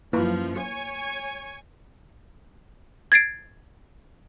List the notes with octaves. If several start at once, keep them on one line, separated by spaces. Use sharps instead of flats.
F#2 F3 A#3 E4 B4
C#5 G#5
G#6 A6 C7 D7